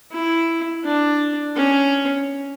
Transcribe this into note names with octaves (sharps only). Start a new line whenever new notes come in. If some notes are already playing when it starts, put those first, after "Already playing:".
E4
D4
C#4